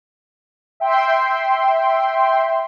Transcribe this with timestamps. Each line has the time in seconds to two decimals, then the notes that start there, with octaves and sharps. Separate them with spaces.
0.80 E5 G5 C6